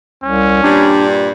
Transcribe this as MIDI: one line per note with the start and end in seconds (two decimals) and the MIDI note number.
0.24 0.60 36
0.24 0.93 61
0.63 1.31 43
0.63 1.31 46
0.63 1.31 55
0.63 1.06 62